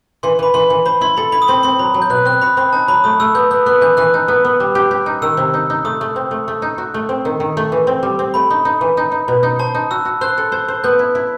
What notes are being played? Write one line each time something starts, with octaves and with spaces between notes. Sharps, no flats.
E3 C6
E3 B5
E3 C6
E3
C5 B5
E4 C6
A4 B5
E4 B5
D#6
C4 C6
C4 C6
F#3 B5
F#3
G6
B2 F#6
C4 F#6
F#4 B5
C4 B5
D#4 A5
F#3 B5
A3 D#6
A3 E6
B3 G6
B3 G6
B3 F#6
E3 G6
E3 F#6
D#4
B3
B3
G3
G4
G4
D#4
D#3 E6
C3
D#4
D#4
A3 D#6
A3
C4
A3
A3
D#4
F#4
A3
C4
D#3
D#3
A3
E3
C4
G3
C4
A3 B5
D#4
D#4
E3
D#4
D#4
B2
D#4
C5 A5
D#4
F#4 E6
F#4
C5 F#6
A4
C5
C5
B3 G6
E4
E4